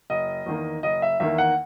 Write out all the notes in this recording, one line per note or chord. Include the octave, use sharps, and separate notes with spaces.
F#1 D#5
E2 D#3 A#3
F#1 D#5
E5
E2 D#3 A#3 E5
F#5